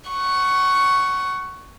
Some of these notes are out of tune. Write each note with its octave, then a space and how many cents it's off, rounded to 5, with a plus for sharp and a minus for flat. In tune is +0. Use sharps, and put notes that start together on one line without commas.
F#5 +25 C#6 +0